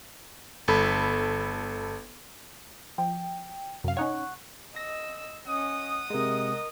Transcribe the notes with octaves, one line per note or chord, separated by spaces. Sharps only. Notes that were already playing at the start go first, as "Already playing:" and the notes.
G1 A4 B5
F3 G5
F#2 C3 F5
C#4 D#4 C#5 F#5 C#6 F#6
D#5 E6 A#6
C#4 D#5 F#5 D#6
C3 G#3 A#4 D#5